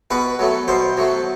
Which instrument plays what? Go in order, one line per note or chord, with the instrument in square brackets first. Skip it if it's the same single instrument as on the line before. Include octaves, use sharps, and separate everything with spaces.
[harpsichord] B2 B4
F#3 A3
B2 C5
F#3 A3